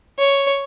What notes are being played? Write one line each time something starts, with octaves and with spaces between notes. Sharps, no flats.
C#5